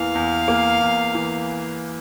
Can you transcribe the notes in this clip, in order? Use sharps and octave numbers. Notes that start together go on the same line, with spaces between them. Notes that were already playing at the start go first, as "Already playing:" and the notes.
Already playing: E2 E3 A#3 F5
E2
A#3
E2
E3